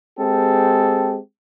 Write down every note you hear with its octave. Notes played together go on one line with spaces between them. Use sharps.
G#3 C4 G4 A4